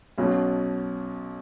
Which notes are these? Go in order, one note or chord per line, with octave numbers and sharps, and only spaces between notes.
B1 B2 F#3 C#4